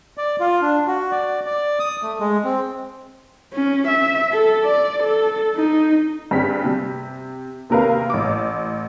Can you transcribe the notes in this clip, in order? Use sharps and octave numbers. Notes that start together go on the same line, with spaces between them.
D5
F4
D4
F#4
D5
D5
D#6
A3
G#3
C4
C#4
E5
A4
D5
A4
D#4
G2 G3 C4 G#4 B6
C3
D#2 C3 A#4 B4 F5
A1 D6